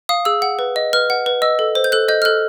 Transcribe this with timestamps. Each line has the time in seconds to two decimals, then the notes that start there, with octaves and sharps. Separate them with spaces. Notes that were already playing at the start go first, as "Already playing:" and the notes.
0.09 F5 D#6
0.25 G#4 E6
0.42 F#5
0.59 B4
0.76 D#5
0.93 B4 F6
1.10 F#5
1.26 B4
1.42 D#5 E6
1.59 A4
1.75 C5
1.84 G6
1.92 A4 F#6
2.08 D#5 G6
2.22 F6
2.25 A4 F#6